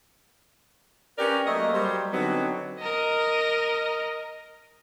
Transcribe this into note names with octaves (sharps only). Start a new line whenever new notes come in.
C#4 G4 A#4 B4 D5
F#3 A3 A#3 D#5
F#3 G3 C5
D3 F#3 B3 C4 D#4
A#4 D#5